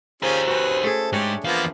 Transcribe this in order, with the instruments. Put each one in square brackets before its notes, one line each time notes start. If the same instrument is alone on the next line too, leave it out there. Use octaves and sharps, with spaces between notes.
[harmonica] C#4 F4 G#4 [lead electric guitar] G4 A#4 [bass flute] C5
[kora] C#4 F#4 [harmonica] B4
[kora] A3 G#4 [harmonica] A4
[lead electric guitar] G#2 G#3 [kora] D4 C#5 [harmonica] G4
[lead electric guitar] E2 F5 [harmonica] F3 A#3 B3